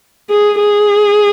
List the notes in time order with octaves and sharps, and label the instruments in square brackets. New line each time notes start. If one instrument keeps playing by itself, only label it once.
[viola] G#4
G#4